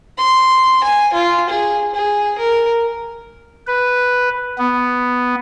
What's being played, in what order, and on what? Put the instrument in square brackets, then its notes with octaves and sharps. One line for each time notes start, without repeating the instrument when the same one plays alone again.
[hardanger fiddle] C6
G#5
F4
G#4
G#4
A#4
[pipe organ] B4
B3